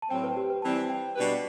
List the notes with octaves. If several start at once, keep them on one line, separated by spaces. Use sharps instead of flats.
A5
A2 F#3 C4 G5
B4
G4
B4
E3 G3 C4 A5
G5
B2 G3 D4 G4 B4